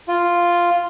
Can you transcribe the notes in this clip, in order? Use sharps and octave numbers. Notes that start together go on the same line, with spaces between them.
F4